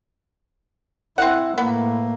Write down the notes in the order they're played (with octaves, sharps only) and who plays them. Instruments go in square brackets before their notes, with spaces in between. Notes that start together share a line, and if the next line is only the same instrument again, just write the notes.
[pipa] C4 F#5 [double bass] E4
[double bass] A2 A#3 [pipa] B3